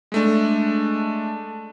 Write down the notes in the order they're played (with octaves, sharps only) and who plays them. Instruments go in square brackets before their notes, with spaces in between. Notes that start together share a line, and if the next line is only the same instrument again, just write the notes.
[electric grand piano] G#3 A3 D4